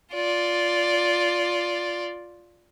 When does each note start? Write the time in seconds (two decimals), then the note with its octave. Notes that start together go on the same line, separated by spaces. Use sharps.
0.14 F4 D5